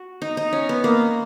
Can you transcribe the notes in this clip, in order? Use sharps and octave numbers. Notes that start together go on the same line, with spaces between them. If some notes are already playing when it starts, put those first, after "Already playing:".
Already playing: F#4
D#4
D#4
C#4
B3
A#3